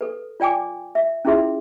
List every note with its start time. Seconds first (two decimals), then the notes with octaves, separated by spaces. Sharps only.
0.01 A4 B4
0.40 F4 D5 G5 G#5 D6
0.95 E5
1.25 C#4 E4 F4 G#4 E5 C6